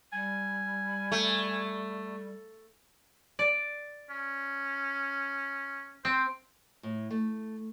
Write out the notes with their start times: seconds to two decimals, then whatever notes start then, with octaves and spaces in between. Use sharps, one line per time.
0.12 G3 G#5
1.12 A3
3.39 D5
4.10 C#4
6.05 C4 C5
6.83 A2
7.11 A3